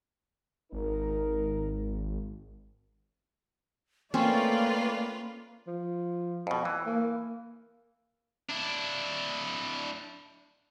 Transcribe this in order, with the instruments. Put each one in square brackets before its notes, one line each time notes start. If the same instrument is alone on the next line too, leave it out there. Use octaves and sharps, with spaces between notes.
[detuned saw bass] G#1 [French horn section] D#4 A#4
[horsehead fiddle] A3 D5 [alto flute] A#3 [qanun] C4 C#4 [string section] F4 B4
[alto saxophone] F3
[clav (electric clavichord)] F2 B2
E3
[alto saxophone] A#3
[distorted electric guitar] D4 E4